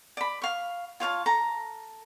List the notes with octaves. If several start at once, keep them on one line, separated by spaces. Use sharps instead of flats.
D5 B5
F5 C#6
F4 C#5 F5 A5
A4 A#5